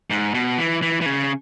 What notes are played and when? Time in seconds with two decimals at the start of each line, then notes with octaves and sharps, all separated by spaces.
0.10 G#2
0.34 B2
0.58 E3
0.82 E3
1.01 E3
1.06 C#3